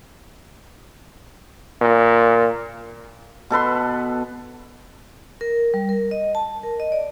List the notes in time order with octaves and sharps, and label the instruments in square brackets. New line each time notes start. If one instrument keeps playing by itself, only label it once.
[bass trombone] A#2
[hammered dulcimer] B2 A4 B4 C6
[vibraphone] A#4
G3
A#4
D#5
A5
A#4
D#5
D5